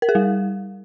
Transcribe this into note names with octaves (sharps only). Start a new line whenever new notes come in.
A#4
G#4
G3